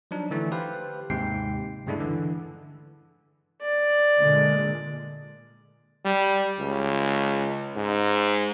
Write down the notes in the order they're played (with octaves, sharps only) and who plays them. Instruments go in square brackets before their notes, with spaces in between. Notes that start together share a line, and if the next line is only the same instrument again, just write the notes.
[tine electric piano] F3 F#3 D4 D#4
D3 E3 A3 D4
G4 B4 C5 F5
D#2 G#2 C3 G5 C7
G2 C#3 G#3 A3 D4 E4
D3 E3
[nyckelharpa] D5
[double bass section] A#2 D3 G#3
[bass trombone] G3
C#2
G#2